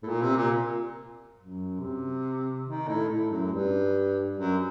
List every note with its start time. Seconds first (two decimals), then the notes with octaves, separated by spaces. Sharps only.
0.03 A2
0.08 A#2
0.22 C3
0.36 A#2
1.38 F#2
1.80 C3
2.66 D#3
2.88 A2
3.08 A2
3.31 F#2
3.51 G2
4.37 F#2